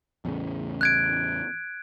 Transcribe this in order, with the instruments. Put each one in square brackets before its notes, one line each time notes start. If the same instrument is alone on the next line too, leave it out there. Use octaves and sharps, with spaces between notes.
[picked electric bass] E2 A2 C#3
[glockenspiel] F#6 G#6 D7